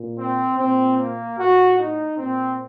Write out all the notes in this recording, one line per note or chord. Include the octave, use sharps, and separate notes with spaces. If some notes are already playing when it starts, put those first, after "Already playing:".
Already playing: A#2
C4
A#2 C4
A#3
A2 F#4
D#4
A#2 C4